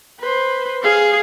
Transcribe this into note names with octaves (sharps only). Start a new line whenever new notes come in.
B4 C5
G#4 F5